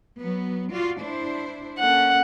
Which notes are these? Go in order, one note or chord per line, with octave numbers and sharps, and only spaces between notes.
F#3 B3
F4 F#4 D5
D4 E4 C5
A#3 C#4 A4 F#5